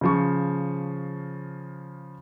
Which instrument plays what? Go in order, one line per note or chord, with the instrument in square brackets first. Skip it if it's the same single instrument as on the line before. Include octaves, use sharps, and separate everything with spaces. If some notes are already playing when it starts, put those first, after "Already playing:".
[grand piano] C#3 F3 C#6